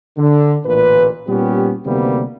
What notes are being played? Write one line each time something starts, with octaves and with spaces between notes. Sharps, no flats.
D3
A1 A#2 B4
A#2 G3 B3 C#4 G4
D2 C3 D#3 G3 A#3 B3